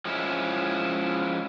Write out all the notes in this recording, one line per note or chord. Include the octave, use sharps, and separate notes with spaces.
F3 G#3 C#4 E4